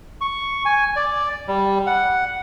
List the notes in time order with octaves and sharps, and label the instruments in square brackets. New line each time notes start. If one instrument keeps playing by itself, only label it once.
[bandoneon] C#6
G#5
D5
G3
F#5